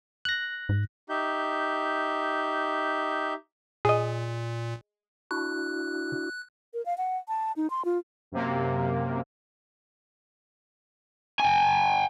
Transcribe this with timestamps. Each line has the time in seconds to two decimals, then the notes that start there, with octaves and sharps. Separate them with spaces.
0.25 F#6 A#6
0.69 G#2
1.09 D#4 G4 E5 G6
3.85 A#2 G#4 D#5
5.31 D4 E4 F#4 F#6
6.74 A#4
6.86 F5
6.98 F#5
7.28 A5
7.57 D#4
7.70 C6
7.85 F4
8.32 F#2 C3 A#3
11.40 G5 G#5